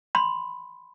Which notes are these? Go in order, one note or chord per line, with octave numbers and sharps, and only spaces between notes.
B5 C6